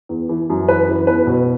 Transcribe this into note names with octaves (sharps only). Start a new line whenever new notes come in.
E2
E3
F#2
E3 B4
E3
E2 B4
B2